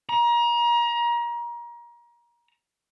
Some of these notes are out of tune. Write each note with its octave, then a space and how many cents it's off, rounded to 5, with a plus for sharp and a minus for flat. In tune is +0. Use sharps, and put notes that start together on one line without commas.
A#5 +30